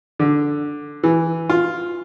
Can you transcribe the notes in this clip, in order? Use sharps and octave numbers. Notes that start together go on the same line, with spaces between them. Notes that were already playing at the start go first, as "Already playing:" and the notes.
D3
E3
F4